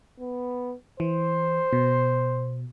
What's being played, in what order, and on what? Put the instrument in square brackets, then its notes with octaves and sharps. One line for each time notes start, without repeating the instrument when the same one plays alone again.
[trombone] B3
[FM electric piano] E3 [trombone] C5
[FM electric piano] B2